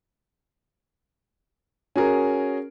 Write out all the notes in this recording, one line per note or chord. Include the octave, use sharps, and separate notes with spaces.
C#4 F#4 G#4 A#4